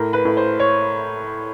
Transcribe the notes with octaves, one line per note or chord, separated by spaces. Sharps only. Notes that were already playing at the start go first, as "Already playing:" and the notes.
Already playing: A2 A#4
B4
A2
C5
C#5